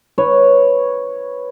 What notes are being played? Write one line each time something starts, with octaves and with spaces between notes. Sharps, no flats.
B4 C#5